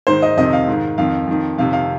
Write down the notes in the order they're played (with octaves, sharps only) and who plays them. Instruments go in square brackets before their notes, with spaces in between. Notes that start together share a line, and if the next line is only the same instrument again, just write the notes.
[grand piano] G#2 D#3 C5
D#5
F2 C3 D#3 D#5
F5
G#2 D#3
F2 D#3 F5
F2 D#3
F2 C3 D#3 F5
F5